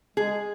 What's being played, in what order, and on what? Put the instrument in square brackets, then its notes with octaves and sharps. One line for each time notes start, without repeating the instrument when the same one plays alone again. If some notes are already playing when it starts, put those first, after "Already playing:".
[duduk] G#3 [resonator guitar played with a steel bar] G#4